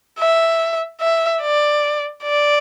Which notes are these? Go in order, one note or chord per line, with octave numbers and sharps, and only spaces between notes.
E5
E5
D5
D5